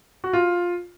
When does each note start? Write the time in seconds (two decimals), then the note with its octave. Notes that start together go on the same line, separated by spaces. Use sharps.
0.24 F#4
0.33 F4